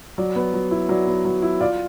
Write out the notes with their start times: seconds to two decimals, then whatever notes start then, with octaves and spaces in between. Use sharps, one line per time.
0.18 F#3 D5
0.36 B3
0.54 F#3
0.71 E4
0.89 F#3 D5
1.07 B3
1.25 F#3
1.42 E4
1.61 F4 D5